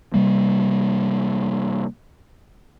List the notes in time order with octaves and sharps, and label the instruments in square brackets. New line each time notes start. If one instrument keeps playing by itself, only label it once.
[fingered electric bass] C3 G3 A#3